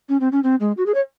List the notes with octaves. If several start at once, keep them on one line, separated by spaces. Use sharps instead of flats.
C#4
C4
C#4
C4
G#3
F#4
G#4
C#5